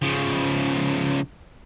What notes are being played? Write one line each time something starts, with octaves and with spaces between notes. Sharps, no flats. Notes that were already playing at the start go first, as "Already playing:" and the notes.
C#3 F3